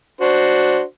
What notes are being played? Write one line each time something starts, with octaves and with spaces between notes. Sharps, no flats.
D4 F#4 C5